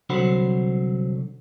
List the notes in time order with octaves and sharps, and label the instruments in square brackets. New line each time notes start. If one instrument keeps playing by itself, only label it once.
[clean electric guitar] C2 D3 F#3 C5 F#5 B5